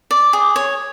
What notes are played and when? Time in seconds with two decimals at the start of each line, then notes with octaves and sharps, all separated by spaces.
0.11 D5
0.33 G#4
0.56 C#5